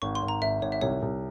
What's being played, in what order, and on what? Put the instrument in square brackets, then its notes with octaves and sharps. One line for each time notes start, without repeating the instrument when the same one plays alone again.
[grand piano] G#1 [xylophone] C#6
[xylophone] C6
[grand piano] G#1
[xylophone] A#5
[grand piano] G#1 [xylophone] E5
[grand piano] G#1 [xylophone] C#5
[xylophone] E5
[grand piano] C2 [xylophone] C#5
[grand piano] C2